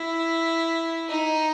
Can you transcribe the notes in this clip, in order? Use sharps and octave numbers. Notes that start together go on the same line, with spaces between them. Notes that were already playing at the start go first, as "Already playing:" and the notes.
Already playing: E4
D#4